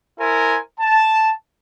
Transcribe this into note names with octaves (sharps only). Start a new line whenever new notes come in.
E4 A#4 C5 G#5
A5